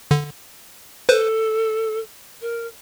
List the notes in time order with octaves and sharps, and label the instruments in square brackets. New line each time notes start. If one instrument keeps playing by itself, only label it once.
[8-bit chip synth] D3
[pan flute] A4 [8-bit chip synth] B4 C5
[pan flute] A#4